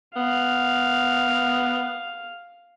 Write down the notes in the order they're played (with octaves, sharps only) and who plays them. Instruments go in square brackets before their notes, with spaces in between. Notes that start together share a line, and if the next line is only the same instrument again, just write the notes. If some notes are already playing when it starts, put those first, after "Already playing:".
[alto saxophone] B3 [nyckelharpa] F5